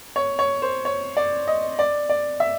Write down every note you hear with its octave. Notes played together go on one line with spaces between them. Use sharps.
C#5
C#5
C5
C#5
D5
D#5
D5
D5
E5